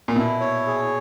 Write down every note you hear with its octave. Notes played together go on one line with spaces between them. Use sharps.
A#2
B2 E4
C#5
G#4